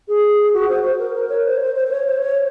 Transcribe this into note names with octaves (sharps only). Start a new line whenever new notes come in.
G#4
F#4
C5
C5
A#4
A#4
C#5
C5
C5
C5
C5
C#5
C5
C#5